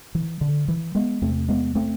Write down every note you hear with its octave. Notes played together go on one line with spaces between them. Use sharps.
E3
D3
E3
G#3 B3
E2 C3 A3 C4
G#3 B3
A3 C4